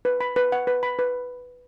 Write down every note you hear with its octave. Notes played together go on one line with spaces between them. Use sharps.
B4
B5
B4
F#5
B4
B5
B4